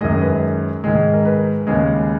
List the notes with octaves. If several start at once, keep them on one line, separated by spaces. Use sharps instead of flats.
F#2 D#3 G#3 D#5
B4
G#2 D#3 G#3
A#4
B4
D#2 C#3 G#3